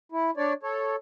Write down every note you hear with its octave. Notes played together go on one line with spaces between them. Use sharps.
E4
D4 C#5 D5
A4 C#5